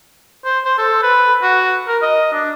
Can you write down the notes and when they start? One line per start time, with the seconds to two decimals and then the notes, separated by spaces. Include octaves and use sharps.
0.45 C5
0.65 C5
0.78 A4
1.02 B4
1.42 F#4
1.88 A#4
2.02 D#5
2.33 D4